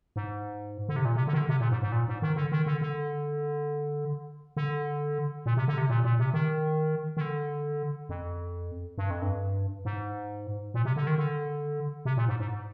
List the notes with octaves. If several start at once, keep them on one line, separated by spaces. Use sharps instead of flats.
G#2
D3
C3
A#2
C3
D3
D#3
D3
C3
A#2
G#2
G#2
A#2
G#2
D#3
D3
D#3
D3
D3
D3
A#2
C3
D3
C3
A#2
A#2
C3
D#3
D#3
D3
F2
G2
F2
G2
G#2
A#2
C3
D3
D#3
D3
C3
A#2
G#2
G#2